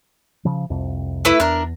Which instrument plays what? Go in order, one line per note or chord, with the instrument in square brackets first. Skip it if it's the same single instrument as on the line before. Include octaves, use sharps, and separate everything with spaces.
[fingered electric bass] C#3 F3
C2 F2 C3
[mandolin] A3 E4 B4
[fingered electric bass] E2 [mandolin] D4 A#4